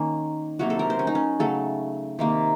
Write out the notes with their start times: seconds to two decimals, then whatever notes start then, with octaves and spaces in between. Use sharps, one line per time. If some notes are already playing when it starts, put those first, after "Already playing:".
Already playing: D#3 A#3 C#4
0.59 C3 F#3 A#3 F#4
0.70 A4
0.79 A#4
0.90 C5
0.99 C#4
1.07 D#4
1.15 C#4
1.40 C#3 F#3 A3 A4
2.19 C3 D#3 A#3